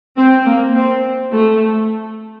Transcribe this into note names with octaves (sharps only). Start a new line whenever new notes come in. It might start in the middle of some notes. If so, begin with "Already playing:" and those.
C4
A#3
C4
A3